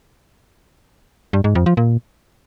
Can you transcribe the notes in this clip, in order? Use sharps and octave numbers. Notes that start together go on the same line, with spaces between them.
G2
G#2
F2
F3
A#2